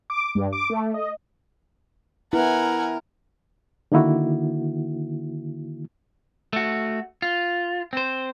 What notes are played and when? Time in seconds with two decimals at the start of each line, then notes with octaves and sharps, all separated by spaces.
0.10 D6
0.35 G2
0.53 D6
0.70 A3
0.94 D#5
2.33 B3 E4 A#4 F#5 G#5
3.92 D3 D#3 A#3 E4 F#4
6.53 A3 F#4
7.22 F4
7.93 C4 C5